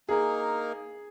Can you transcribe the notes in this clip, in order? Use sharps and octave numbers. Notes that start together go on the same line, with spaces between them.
A#3 D#4 G#4 A#4